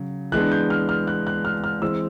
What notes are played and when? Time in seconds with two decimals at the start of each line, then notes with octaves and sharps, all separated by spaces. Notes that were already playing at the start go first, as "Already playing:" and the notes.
Already playing: C#3 F#3
0.32 E3 G#3 B3 D4 F#6
0.52 G6
0.70 F6
0.89 F6
1.07 F#6
1.27 F#6
1.45 F6
1.64 F6
1.82 E3 G#3 C4 E6